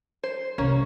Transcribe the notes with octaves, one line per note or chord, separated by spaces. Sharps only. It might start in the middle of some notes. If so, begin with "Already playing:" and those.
C5
C2 A#3 C#4